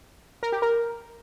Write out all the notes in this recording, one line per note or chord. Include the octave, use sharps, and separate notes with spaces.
A#4
G4
A#4